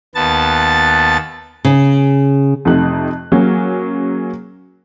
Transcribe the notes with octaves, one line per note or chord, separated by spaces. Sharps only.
D#2 B3 A5 A6
C#3
F2 C3 A3 D#4 F#6
F#3 A#3 C#4 F#4 G#4